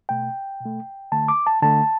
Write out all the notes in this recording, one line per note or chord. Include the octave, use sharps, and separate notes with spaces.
B2 A3 G5
B2 A3
D3 A3 A5
D6
A5
D3 A3 A5